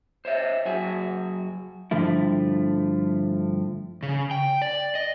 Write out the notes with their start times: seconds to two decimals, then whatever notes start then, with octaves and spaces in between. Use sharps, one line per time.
0.25 C5 C#5 E5
0.65 F#2 F#4 G#4
1.91 G2 D3 F3 A3 E4
4.03 C#3
4.31 G5
4.62 D5
4.95 D#5